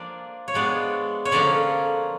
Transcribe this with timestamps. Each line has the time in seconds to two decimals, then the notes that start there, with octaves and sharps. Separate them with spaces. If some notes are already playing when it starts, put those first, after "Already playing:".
Already playing: F3 A#3 D4 D5
0.48 C#5
0.54 F3 G#3 B3 D4 D5
1.25 C#5
1.31 D3 F3 A#3 C#4 D5